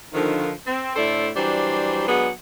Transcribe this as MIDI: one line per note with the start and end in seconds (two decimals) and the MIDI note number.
0.14 0.52 50
0.14 0.52 51
0.14 0.52 53
0.67 0.95 60
0.96 1.30 45
0.96 1.30 50
0.96 1.30 69
0.96 1.30 72
0.96 1.30 74
0.96 1.30 76
1.36 2.06 52
1.36 2.06 54
1.36 2.06 55
1.36 2.06 62
1.36 2.06 72
2.08 2.30 54
2.08 2.30 56
2.08 2.30 59
2.08 2.30 62
2.08 2.30 68
2.08 2.30 78